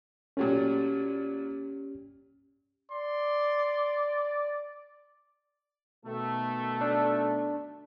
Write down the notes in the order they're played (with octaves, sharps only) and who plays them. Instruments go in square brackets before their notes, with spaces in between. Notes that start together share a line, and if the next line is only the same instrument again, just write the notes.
[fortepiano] A#2 F#3 A3 [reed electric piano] C#4 G4
[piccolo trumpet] D5 [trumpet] C6
[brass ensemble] B2 D#3 A3
[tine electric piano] D4